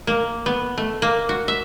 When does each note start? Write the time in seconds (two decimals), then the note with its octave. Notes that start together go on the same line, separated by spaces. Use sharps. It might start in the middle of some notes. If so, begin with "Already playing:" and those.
0.07 A#3
0.46 B3
0.78 A3
1.02 A#3
1.29 F#4
1.48 E5